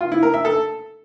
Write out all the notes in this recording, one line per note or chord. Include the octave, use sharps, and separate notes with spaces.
F4
E4
A#4
E5
A4